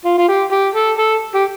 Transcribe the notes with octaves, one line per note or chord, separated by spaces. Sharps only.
F4
F4
G4
G4
A4
A4
G4